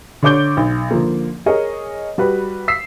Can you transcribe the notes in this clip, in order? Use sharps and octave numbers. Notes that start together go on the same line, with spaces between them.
D3 D4 C#5 D6 G6 G7
B1
D3 F3 A#3
G#4 A#4 C#5 D#5
G3 F#4 B4
E6 B6 C7